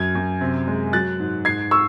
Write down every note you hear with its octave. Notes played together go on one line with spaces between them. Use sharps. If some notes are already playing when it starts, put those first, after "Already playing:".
Already playing: F#2 G#6
F#2
C3
G#3
F#3 F#6 A6
G#2
G#2 G#6 C7
C#6 E6